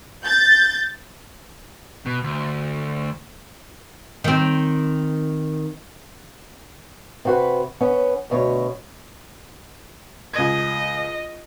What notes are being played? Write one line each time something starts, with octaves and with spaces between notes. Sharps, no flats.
G6 A6
B2
D2
D#3 C4
C3 F#4 B4
B3 C#4
D2 B2 A4 C#5
C#2 D#5 G#6